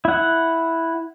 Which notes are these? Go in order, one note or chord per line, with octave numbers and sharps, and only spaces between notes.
E4 F#5